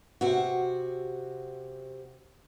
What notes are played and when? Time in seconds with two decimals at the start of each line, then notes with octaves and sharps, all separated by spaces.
0.21 C3 F#4